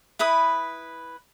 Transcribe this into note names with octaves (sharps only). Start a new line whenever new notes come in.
E4 B4 B5 D#6